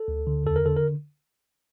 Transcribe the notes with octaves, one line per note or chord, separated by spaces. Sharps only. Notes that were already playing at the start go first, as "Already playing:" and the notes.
Already playing: A4
D2
D3
E2 A4
A#4
D3 A4
A#4